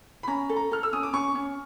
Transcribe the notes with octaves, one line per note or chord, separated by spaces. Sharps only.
B5
C#4 A#5
A4
A#5
A4 F6
E6
C#4 D#6
D6
C#4 C#6
C#4